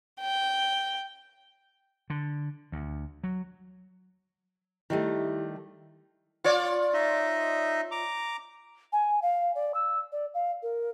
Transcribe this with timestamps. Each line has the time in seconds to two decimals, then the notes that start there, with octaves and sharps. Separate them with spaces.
0.21 G5
2.10 D3
2.72 D2
3.24 F#3
4.90 D#3 G3 A3 E4 G4
6.44 F4 C#5 D5
6.94 D#4 D#5 E5
7.91 A#5 D6
8.93 G#5
9.22 F5
9.55 D5
9.74 E6
10.12 D5
10.34 F5
10.63 A#4